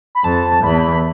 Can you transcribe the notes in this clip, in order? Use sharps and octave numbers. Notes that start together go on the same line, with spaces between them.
B5
F2 A5
E2 B5